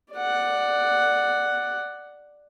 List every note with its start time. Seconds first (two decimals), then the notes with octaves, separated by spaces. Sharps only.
0.13 D5 F#5